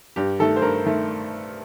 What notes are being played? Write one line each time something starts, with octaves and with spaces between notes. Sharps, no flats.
G2 G4
D#3 A3 A4
C5
G2 A#4
D#3 A3